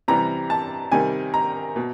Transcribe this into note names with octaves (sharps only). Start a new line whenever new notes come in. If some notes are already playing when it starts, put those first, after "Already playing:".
C3 E3 G3 A#5
A5
C3 D#3 G3 G#5
A#5
B2